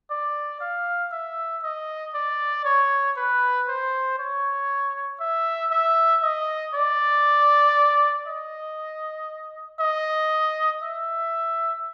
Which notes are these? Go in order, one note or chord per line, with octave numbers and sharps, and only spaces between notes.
D5
F5
E5
D#5
D5
C#5
B4
C5
C#5
E5
E5
D#5
D5
D#5
D#5
E5